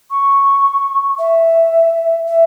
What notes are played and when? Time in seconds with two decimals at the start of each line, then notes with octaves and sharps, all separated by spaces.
0.11 C#6
1.19 E5
2.28 E5